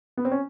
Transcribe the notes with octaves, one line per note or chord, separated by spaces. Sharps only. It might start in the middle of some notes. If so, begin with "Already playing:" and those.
B3
C4
C#4